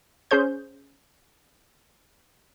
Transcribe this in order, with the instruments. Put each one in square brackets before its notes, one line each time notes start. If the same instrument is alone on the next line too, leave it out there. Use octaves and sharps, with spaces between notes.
[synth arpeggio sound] C#4 G#4 C5 G6